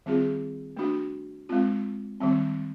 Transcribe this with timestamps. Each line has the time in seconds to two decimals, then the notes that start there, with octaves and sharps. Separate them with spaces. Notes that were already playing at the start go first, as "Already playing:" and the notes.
0.06 D#3 G3 C4 F4 G#4
0.77 A3 D4 F#4
1.49 G#3 C4 F4
2.20 D#3 G3 C4